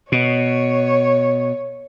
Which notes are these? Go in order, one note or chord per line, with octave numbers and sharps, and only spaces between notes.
B2 C#5